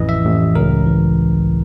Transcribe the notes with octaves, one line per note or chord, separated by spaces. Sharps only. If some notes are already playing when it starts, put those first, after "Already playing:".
Already playing: A1 F2 E3 D#5
E5
A1
C#2 A#4
E3